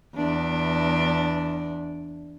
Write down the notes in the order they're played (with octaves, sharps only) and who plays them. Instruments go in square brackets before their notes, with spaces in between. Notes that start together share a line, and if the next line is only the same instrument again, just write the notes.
[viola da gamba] E2 D4